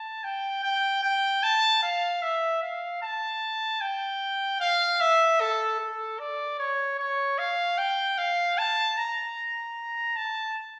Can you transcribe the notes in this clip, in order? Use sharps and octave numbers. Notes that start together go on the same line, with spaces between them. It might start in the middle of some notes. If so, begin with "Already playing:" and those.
Already playing: A5
G5
G5
G5
A5
F5
E5
F5
A5
G5
F5
E5
A4
A4
D5
C#5
C#5
F5
G5
F5
A5
A#5
A5